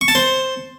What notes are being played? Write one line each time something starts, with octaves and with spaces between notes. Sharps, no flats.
C#6
A5
C5